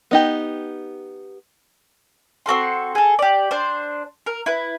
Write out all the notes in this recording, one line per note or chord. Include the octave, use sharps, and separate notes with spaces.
B3 D#4 G4
C4 F#4 A4 C6
G#4 A4
G4 D5
D4 C5
A#4
E4 B4